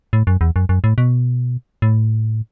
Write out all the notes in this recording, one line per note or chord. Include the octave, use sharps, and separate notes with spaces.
A2
F#2
E2
F#2
F#2
A2
B2
A2